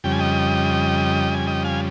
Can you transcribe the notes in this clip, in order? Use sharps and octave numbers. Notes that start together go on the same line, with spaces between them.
F2 C#3 G3 G5
G#5
D#5 G5
G#5
D#5 G5
F5 G#5